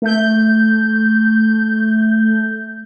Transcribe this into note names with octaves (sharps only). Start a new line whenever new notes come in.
A3 G6